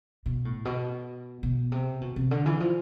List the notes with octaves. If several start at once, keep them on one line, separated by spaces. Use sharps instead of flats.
B2
A2
B2
B2
C3
B2
C3
D3
E3
F3